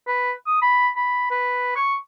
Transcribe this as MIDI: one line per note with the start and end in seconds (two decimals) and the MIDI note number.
0.07 0.32 71
0.47 0.57 87
0.62 0.89 83
0.96 1.29 83
1.31 1.71 71
1.76 1.95 85